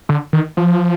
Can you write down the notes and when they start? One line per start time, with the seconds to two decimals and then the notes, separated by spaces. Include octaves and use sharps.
0.09 D3
0.33 D#3
0.57 F3